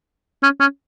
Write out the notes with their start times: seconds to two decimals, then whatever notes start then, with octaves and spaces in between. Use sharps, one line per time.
0.43 C#4
0.60 C#4